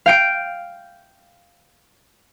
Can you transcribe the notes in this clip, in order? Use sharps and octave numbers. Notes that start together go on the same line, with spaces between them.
F5 G5 D7